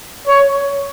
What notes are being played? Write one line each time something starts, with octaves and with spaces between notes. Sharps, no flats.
C#5